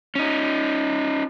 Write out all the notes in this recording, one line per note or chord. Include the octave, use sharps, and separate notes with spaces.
C#4 D#4